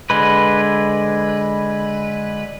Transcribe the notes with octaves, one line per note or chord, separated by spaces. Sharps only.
D3 G#3 B4